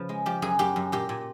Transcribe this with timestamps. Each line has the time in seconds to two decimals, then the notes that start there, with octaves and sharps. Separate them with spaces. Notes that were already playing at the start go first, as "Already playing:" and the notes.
Already playing: C#3 F3 B4
0.09 G#3
0.26 F3 G4
0.42 F#2 G#4
0.59 F#2 G4
0.76 F#2
0.92 A#2 G4
1.09 A#2